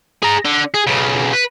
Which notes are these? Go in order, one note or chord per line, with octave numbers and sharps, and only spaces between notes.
G#4 A#5
D3
G#4
B1 C#3
B4